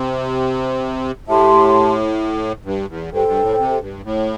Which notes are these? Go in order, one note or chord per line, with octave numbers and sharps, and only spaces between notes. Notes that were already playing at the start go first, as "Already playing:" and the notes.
Already playing: C3
A2 G4 E5 A5 C6
G2
E2
G2 A4 C5 G5
G2
A2
C3
G2
A2